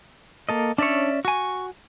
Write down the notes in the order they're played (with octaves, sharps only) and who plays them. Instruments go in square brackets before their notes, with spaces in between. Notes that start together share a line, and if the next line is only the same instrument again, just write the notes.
[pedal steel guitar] A#3 A4 D#5
[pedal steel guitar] C#4 D5 E5 [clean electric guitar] D4 C#5
[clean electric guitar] F#4 G#5 [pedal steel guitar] C#6